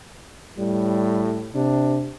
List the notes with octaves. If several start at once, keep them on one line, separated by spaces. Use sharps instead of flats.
A2 G3
C3 D4